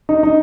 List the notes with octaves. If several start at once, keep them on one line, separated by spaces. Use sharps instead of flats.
D#4
D#4